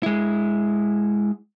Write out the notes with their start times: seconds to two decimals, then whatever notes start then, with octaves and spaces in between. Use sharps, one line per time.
0.03 G#3 E4